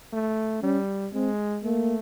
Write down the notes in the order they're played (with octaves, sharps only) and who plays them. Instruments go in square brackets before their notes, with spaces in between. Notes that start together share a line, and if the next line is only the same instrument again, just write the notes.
[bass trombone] A3
[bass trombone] G3 [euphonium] C#4
[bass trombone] G#3 [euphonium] C4
[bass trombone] A3 [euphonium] A#3